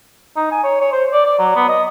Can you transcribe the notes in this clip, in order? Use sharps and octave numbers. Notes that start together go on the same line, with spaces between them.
D#4
G#5
C#5
C#5
C5
D5
D5
F#3
B3
D#5